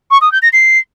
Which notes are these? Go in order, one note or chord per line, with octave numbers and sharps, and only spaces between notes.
C#6
D#6
G6
A#6
C7